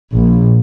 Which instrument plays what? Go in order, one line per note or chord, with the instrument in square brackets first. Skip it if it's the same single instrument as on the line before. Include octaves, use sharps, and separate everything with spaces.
[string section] A#1